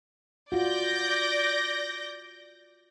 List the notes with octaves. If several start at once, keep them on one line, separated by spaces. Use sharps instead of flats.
F4 F#4 D5 G6 A#6